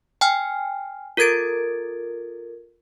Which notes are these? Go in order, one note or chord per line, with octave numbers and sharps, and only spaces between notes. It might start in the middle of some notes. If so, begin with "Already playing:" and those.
G5 G#5 F6
F4 A4 A#4 G#6 A6 D7